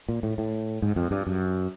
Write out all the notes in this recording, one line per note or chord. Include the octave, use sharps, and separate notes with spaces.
A#2
A2
A2
G#2
F2
G2
F#2